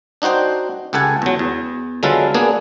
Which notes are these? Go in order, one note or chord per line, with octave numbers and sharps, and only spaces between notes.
D4 D#4 F#4 C5 G5
C#2 G4 A4 F#5 G#5
E2 F#3
E2
D3 F#3 G#3 F4 A4 B4
A#3 B3 D4 G#4